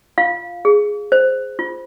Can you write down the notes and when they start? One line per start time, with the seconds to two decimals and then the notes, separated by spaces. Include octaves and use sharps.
0.18 F4 F5
0.65 G#4
1.12 C5
1.59 F4